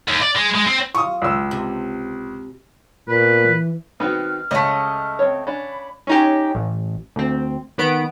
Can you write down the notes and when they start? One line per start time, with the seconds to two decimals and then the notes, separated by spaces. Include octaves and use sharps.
0.08 D#2
0.21 D5
0.36 G#3
0.54 G#3
0.66 C4
0.95 F4 C#6 D#6
1.22 C#2 E6
1.51 C3
3.08 A#2 B3 B4
3.46 E3
4.00 D#3 B3 C4 D#4 F#4 B4 F6
4.51 C#2 A3 C#4 D#5
5.19 C4 C#5
5.47 C#4 D4 B5
6.07 C#4 D#4 G4
6.55 A1
7.16 D2 C4
7.78 D#3 B3 D7